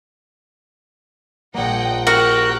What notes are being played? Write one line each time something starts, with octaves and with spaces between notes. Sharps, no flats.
A#1 A#3 D#5 F#5 G5
F#4 G4 A#4 G5 F#6